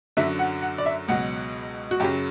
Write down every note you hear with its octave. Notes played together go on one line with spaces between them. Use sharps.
F#2 D3 F#3 E5
F#5
F#5
D5
E5
C#2 B2 F#3 F#5
F#4
F#2 C#3 F#3 G4